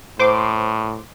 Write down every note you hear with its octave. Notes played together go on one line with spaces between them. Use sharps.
A2 C5 C6 D6